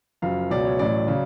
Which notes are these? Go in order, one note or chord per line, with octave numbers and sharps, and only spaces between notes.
F#1 F#2 F3 F5
C#2 B2 F#3 D5
C#5
A1 A2 F#3 D5
C#3 F#3